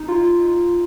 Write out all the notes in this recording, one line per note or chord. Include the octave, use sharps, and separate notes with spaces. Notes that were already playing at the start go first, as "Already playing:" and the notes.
Already playing: D#4
F4
F4